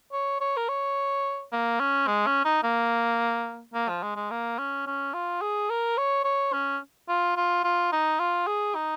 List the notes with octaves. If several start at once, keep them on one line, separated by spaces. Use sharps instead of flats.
C#5
C#5
A#4
C#5
A#3
C#4
G#3
C#4
D#4
A#3
A#3
F3
G#3
G#3
A#3
C#4
C#4
F4
G#4
A#4
C#5
C#5
C#4
F4
F4
F4
D#4
F4
G#4
D#4